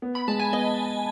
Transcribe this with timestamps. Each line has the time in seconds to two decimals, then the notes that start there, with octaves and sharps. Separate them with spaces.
0.02 B3
0.15 B5
0.28 G#3 A5
0.40 G#5
0.53 B3 D#5